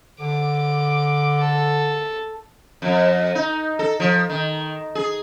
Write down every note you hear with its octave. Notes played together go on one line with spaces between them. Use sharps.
D3 D6
A4
F2
D#4
A4
F3
D#3
G#4